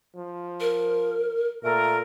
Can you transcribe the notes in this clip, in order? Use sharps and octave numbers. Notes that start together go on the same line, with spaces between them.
F3
A#4
A#2 A3 A4 A#4